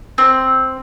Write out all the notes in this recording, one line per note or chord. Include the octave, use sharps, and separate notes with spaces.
C4